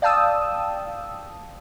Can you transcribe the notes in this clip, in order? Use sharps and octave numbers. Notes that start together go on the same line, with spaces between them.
D5 F5 G5 A5 D#6 E6